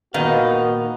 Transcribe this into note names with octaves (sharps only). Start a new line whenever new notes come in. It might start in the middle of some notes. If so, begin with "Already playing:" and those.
A#2 D#3 B3 F#4 D#5 F5